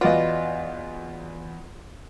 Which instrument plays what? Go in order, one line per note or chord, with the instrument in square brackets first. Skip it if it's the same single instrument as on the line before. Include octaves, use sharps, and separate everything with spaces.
[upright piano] E2 B4 [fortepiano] F4 F#4 [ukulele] D5 D#5